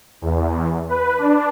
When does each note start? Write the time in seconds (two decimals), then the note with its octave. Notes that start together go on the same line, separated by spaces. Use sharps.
0.22 E2
0.89 B4
1.18 D4